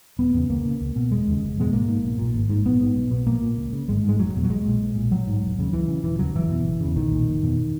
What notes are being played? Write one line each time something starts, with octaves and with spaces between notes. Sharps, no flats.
E1 B3
E2 C#3
C#2 A#3
C#3
C#2
B2
E1 G#3
D#2 C#3
F#1
E2 B2 G#3
G#1 A#3
G#2
B1
A#2
G#1
G#2
A#1 B3
G#2
B1
B2
A#1 A#3
A#2
C#2
C#3
G#1 G#3
G#2
G#3
E1 F#3
E2 B2
F#3
B1 G#3
A#2
B1
A#2
A#1 F#3
G#2
E1
D#2 C#3
C#2 E3
C#3
E1 E3
D#2 C#3 F#3
F#1 E3
E2 B2
F#1
E2 C#3
B1 D#3
A#2
F#1
E2 B2